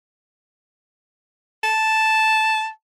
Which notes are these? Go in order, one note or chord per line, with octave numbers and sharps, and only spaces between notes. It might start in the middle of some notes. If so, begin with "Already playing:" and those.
A5